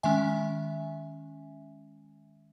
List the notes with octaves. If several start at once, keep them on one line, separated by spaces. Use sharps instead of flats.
D#3 G#3 C#4 E5 G#5